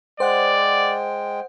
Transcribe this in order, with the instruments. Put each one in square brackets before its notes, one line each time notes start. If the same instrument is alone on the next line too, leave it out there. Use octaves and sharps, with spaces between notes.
[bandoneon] G#3 G5 [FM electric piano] C5 F#5 [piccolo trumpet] D5